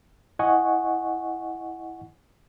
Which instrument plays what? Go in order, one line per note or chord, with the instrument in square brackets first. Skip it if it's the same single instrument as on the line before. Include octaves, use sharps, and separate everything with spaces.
[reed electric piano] E4 D#5 F#5 G#5 C#6